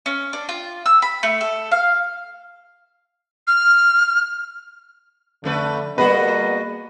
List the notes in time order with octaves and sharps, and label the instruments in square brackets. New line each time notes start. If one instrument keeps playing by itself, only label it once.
[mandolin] C#4
D4
F4
E6
B5
A3
A4
F5
[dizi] F6
[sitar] F2 A3 B4 [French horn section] D3
[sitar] G3 F#4 G#4 [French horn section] A#3 B3 [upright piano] B4 [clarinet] D#5